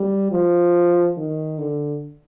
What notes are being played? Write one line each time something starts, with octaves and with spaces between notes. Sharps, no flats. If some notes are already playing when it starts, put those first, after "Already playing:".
Already playing: G3
F3
D#3
D3